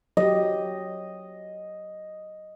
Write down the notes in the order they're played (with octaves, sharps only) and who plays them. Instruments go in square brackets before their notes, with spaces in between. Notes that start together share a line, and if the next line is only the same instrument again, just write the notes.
[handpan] F#3 G4 [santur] D#5